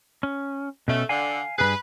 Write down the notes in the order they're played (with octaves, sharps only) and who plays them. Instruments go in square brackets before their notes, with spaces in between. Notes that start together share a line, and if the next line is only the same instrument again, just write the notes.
[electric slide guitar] C#4
[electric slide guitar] B2 C#4 [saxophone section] A3
[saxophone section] D3 [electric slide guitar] F5 G#5
[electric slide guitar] G2 C3 G#4 [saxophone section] B4